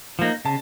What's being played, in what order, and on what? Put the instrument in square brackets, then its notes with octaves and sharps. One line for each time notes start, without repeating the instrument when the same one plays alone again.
[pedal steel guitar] F3 A#3 D#4
[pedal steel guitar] C#3 [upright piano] A5